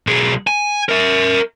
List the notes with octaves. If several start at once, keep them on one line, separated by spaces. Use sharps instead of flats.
B1 G#4
G#5
A#4 E5